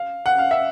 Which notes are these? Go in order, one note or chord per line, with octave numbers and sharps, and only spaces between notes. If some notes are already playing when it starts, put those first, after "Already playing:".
Already playing: F5
F#5
F5
E5